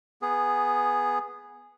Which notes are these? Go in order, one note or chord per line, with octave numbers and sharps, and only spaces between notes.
B3 G#4